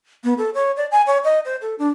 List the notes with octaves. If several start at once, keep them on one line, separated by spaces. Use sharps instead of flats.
B3
A4
C#5
D5
G#5
C#5
D#5
C5
A4
D4